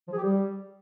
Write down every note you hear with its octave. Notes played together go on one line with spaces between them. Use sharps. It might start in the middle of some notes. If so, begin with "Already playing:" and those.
F3
G#4
G4
G3